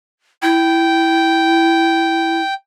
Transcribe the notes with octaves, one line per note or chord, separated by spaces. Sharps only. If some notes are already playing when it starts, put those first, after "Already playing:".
E4 G5